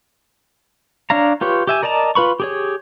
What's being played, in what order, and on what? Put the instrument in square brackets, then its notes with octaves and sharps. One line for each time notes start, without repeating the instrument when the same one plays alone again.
[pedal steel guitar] D4 C#5 F5 A#5
F4 G4 B4 C#5
G4 E5 G#5
A#4 D5 D#5 A5 A#5
F4 B4 B5 C#6
G4 G#4 C#5